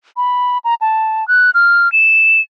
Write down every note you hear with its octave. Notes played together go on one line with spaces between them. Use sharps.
B5
A#5
A5
F#6
F6
E7